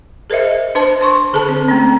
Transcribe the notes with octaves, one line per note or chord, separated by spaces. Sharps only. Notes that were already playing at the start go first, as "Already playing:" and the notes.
G#4 A#4 C5 D#5 E5
D4 B4 C5 A5
C5 C6 C#6
D3 G#4 A4 A5
C4
A3 A#3 C4 C#4